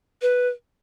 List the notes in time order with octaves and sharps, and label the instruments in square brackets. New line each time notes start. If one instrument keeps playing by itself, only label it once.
[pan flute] B4